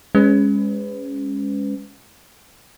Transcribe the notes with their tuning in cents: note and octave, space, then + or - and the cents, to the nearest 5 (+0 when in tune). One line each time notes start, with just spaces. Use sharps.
G#3 -15 C#4 +0 B4 +25